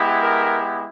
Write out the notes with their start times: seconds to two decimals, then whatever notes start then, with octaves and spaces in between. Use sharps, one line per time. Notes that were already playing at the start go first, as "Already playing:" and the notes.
Already playing: G#3 B3 E4 G4
0.20 A#4